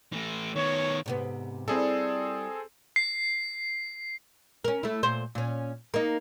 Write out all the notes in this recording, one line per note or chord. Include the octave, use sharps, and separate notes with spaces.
E3 A3
D#3 B3 C#5
G#2 C3 B3
G3 C4 E4 G#4 A4
C7
C#4 A#4
A3 E4
A#2 C5
A#2 C#4
A#3 D#4